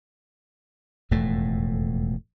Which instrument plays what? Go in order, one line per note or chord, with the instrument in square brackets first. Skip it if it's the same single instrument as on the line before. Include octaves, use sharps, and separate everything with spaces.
[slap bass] E1 F2 A2 A3